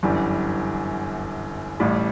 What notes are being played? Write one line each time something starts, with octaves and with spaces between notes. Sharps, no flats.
G1 F#2 E3 G3
A1 A2 G3